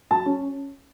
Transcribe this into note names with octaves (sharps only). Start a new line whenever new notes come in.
F#3 A5
C#4